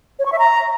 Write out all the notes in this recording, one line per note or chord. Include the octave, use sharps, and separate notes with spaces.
C#5
C#6
E5
A#5